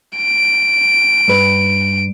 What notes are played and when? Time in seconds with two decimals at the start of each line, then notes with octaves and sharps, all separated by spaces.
0.17 D7
1.28 G2 B4